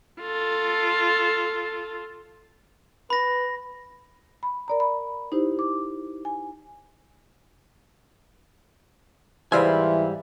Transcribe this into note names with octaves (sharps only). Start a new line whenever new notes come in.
F4 A4
B4 B5 A#6
B5
A#4 D5 A#5
B5
D#4 E4 G4 C5
D6
G#5
G#2 E3 G3 C5 E5 F5 G#5